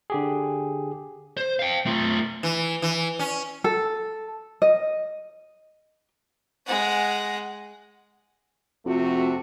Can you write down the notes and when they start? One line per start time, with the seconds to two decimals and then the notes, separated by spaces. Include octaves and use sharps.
0.10 D3 G4 G#4
1.37 C5
1.59 F5 G5
1.86 A3 F4
2.43 E3
2.82 E3
3.19 C#4
3.64 A4
4.62 D#5
6.66 G#3 F#5
8.86 F2 C3 A3 F#4